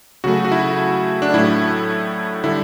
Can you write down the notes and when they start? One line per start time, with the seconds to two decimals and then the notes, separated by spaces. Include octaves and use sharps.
0.24 C#3 F#3 A3 F#4
0.45 F#4
0.52 E4
1.22 D4
1.34 A2 F#3 A3 E4
2.44 D3 G3 E4